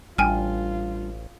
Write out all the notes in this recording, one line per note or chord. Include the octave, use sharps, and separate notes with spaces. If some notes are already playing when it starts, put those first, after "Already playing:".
A1 G3 D4 F4 G5 G#5 F6